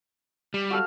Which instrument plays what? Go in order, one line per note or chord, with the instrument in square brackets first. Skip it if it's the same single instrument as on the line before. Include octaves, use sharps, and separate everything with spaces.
[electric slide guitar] G3
[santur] F#4 A4 F5